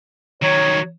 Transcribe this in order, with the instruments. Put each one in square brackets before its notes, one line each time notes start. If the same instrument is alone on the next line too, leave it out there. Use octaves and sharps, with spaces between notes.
[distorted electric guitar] D#3 F#3 [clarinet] C#5